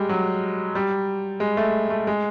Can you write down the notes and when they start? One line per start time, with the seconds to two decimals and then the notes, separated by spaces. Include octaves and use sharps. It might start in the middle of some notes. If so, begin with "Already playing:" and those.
Already playing: G3 G#3
0.09 F#3
0.75 G3
1.40 G#3
1.57 A3
1.90 A3
2.07 G#3